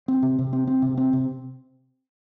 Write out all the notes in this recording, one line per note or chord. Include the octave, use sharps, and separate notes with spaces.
C4
C3
C3
C4
C4
C3
C4
C3